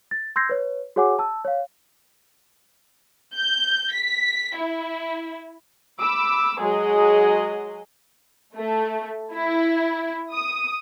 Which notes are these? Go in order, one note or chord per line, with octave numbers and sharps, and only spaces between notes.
A6
C6 E6 G6 G#6 A#6 C7
B4 C#5
F#4 G#4 C#5 F#5 G#5 D6
A5 E6
C#5 F5
G6
B6
E4
B5 D6 E6
F#3 G#3 G#4 D#5
A3
E4
D#6